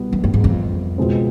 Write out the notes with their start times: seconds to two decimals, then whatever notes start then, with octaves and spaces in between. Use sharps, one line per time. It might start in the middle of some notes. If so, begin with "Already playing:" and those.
Already playing: C2 B2 G3 B3
0.13 F#2
0.24 G2
0.34 G#2
0.44 F2
0.98 C#2 B2 G#3 C4